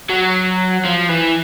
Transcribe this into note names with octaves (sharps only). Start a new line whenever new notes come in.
F#3
F3
E3